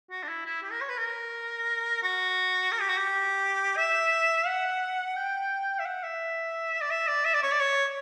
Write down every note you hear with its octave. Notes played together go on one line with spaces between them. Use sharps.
F#4
D4
E4
E4
G4
A#4
C#5
B4
A#4
F#4
A#4
G4
F#4
G4
E5
F#5
G5
E5
F#5
E5
D5
E5
D5
E5
D5
C#5
D5
C#5